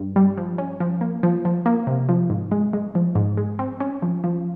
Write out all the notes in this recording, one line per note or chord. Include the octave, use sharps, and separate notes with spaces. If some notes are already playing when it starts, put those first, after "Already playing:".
Already playing: G2
G3
F3
C#4
F3
A#3
F3
F3
A#3
C3
F3
G#2
G#3
G#3
F3
G#2
G#3
C4
C#4
F3
F3